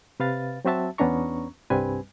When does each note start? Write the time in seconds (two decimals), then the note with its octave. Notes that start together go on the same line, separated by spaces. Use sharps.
0.20 C3 B4 F5 A6
0.65 F#3 C4 F#4 E5 A5
0.98 E2 B3 C#4 D4 A#5 C#6
1.70 C2 G2 G3 C4 B4 G#5